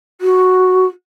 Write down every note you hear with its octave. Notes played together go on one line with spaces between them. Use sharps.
F#4